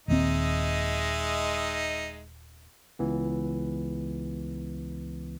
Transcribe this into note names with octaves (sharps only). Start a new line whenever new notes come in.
D#1 D#2 G#3 C4 D#4 E5
C#2 E3 B3